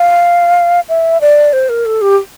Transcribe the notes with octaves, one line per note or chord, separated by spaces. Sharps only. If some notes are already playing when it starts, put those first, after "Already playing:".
Already playing: F5
E5
D5
C5
A#4
A4
G4